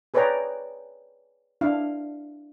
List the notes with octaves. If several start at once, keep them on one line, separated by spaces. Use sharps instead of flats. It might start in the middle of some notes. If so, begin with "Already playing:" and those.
G#4 B4 C#5 D5 G5 A#5
D4 E4 F5